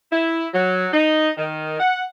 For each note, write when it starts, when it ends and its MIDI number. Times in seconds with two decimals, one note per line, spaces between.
0.12 0.46 64
0.54 0.87 54
0.92 1.30 63
1.38 1.78 51
1.80 2.03 78